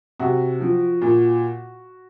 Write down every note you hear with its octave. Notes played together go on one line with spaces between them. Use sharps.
C3 F#4
F3
A#2